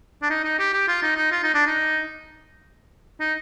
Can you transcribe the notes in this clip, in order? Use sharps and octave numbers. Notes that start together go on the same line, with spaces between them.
D4
D#4
D#4
G4
G4
F4
D#4
D#4
F4
D#4
D4
D#4
D#4